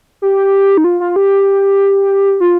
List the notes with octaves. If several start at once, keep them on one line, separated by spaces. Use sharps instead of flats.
G4
D#4
F4
F4
G4
F4